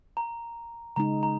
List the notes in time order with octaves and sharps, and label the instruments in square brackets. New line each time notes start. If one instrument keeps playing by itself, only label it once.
[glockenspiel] A#5
[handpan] C#3 G#3 D#4 [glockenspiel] A#5
[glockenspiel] A#5